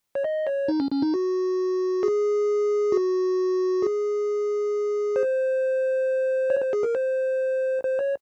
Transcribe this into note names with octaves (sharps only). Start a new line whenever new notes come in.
C#5
D#5
C#5
D#4
C#4
C#4
D#4
F#4
G#4
F#4
G#4
C5
C#5
C5
G#4
A#4
C5
C5
C#5